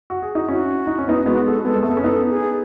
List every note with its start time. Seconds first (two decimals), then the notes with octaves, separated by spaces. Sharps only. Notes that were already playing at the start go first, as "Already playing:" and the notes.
0.10 F#4
0.22 G#4
0.35 D#4 F#4
0.49 C#4 E4 F#4
0.87 D#4
0.98 C#4
1.08 B3 D#4
1.26 G#3 B3 F#4
1.46 A4
1.65 G#3 B3 A4
1.75 G#3
1.83 A3 A4
1.89 B3
1.97 C#4
2.04 B3 D#4 A4
2.30 G#4